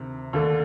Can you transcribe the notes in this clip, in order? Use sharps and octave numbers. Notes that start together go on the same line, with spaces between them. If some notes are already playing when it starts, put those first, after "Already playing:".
Already playing: D2 C3 D#3
D#2 D3 A3 D4 A4